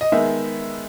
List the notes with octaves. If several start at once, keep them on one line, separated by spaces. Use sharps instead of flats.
D#5
D#3 G#3 B3 D#4 E5